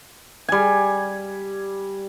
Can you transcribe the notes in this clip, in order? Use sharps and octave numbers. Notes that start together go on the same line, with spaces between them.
G3 G#5